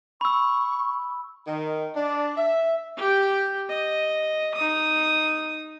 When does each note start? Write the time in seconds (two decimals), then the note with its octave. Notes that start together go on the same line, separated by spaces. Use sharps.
0.21 B5 C#6 E6
1.47 D#3
1.95 D4
2.36 E5
2.97 G4 G5
3.70 D#5
4.55 D#4 D#6